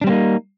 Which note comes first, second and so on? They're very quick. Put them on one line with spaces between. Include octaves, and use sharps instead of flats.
D4 G3 C4 A#3 D#4